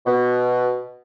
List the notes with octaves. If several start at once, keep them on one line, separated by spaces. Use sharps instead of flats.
B2